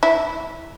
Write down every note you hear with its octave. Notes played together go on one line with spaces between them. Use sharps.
E4